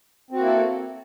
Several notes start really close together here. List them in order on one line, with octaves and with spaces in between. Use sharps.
C4 F#4 A#3 E4 A4